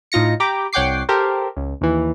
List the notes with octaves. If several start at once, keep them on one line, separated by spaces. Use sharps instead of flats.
A2 D#4 F4 A#6 C#7
G4 G5 A#5 B5 D6
C2 C#5 F#5 G5 D6 C7
G4 A4 A#4 C5
C#2
D#2 E3